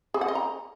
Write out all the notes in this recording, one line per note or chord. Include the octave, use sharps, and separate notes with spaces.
G#4
F#5
D#5
A#5